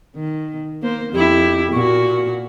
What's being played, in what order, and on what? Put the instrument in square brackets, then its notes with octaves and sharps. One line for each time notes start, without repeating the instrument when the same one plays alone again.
[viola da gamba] D#3
A#3 C5
[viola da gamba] F2 E4 [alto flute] G4
[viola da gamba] A#2 A#3 F#4 [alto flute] C#6